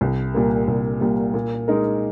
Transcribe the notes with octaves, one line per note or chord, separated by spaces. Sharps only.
C2
A#2 G3 A#3
C2
A#2 G3 A#3
A#2
G#3 D#4 A#4